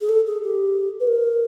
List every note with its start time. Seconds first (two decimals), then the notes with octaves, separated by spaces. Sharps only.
0.01 G#4
0.09 A4
0.26 G#4
0.42 G4
1.00 B4
1.07 A#4